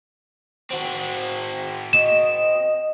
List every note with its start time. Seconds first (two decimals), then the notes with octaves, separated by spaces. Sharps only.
0.70 C4 F#4
1.93 D#5 E7